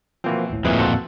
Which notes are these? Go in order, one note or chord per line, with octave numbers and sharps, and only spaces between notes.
B2 E3 F3 A#3 C4
G#1 D2 A2
F2 A#2 E4 G#4 B4
F#4 A4 C5